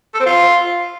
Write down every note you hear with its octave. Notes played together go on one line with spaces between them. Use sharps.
A4
C4
F4